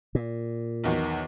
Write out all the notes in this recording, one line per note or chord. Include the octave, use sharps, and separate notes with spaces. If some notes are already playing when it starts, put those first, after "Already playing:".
A#2
B1 E2 D#3